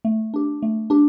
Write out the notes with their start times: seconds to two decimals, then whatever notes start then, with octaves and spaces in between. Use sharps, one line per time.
0.05 A3
0.34 D4 G4
0.62 A3
0.90 D4 G4